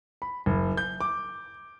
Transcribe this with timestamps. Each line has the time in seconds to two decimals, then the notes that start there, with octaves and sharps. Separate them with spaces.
0.22 B5
0.46 F#1
0.77 G6
1.01 D6